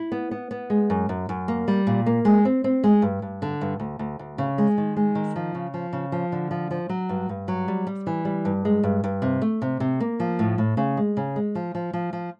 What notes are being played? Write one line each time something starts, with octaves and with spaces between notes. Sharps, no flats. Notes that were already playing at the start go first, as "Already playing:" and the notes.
Already playing: E4
B3
B3
B3
G#3
F#2
F#2
F#2
A#3
G3
A#2
A#3
G#3
C4
C4
G#3
G2
G2
D3
G2
D2
D2
D2
C#3
G#3
D#3
G#3
D#3
F3
C#3
F3
C#3
F3
D3
F3
F3
F#3
G2
G2
F#3
G3
G3
E3
G3
G2
G#3
G2
G2
C3
A3
C3
C3
A#3
F3
A2
A2
C#3
G#3
C#3
G#3
F3
F3
F3
F3